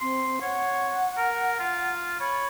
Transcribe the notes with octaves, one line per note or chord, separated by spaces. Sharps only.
C4 C6
C#5 F#5
A#4
F4
C#5 B5